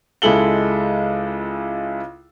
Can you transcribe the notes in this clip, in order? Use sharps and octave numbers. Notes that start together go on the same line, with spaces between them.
C#2 G#3 E4 A4 F#7 G7